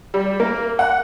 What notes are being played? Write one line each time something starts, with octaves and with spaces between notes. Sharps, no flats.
G3
A#3
F#5